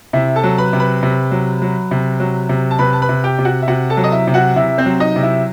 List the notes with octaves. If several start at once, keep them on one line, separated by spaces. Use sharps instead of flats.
C3 E4 E5
A4 A5
F#3
B4 B5
C3
B4 B5
C3
F#3
F#3
C3
F#3
C3
A5
C3 B4 B5
A5
B4 B5
C3
G4 G5
C3
F#4 F#5
E5
C3 F#4 F#5
A4 A5
F#3
D#5
E4 E5
C3
F#4 F#5
C3 E4 E5
C4 C5
F#3
D#4 D#5
C3
E4 E5